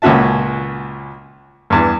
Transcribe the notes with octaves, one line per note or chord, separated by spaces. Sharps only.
C#2 A#2 C#4 F#4 E5 A5
E2 G2